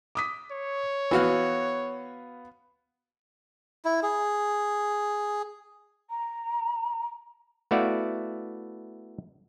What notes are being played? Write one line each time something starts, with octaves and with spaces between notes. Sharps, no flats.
D6 D#6 B6
C#5
E3 B3 F#4 F5 F6
E4
G#4
A#5
A3 B3 E4 F#4 D5 F5